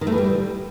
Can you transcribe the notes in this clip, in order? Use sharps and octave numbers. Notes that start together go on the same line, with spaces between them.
D#3
A3
E3
G3